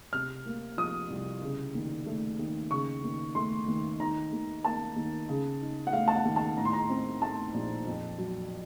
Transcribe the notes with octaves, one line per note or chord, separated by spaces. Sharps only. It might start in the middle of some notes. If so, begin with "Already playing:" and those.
C3 F6
A#3
F3 D#6
C2
C#3
D#2
A3
D#2
C#3 C#6
D#2
A3 C6
D#2
D#3 A#5
D#2
A#3 A5
D#2
C#3
D#4
F#5
A3 F5
A5
F#5
D#2
A5
A2 A#5
C6
A#5
C4
A3 A5
A#1
F2
F#3